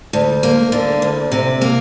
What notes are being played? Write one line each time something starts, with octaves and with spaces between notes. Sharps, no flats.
D2
A#3
D3
D2
C3
A#3